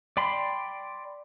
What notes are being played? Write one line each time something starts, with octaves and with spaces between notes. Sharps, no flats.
D5 G5 B5 C6